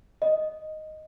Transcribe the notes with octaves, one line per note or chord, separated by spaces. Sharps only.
D#5